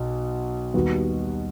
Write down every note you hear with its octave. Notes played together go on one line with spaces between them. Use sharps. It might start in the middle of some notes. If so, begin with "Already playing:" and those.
Already playing: B1 B2
D#2 D#3 G3 B3 F#4